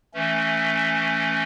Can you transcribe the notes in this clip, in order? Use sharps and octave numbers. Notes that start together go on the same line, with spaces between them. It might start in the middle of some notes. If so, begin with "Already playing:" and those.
E3 A3 C#4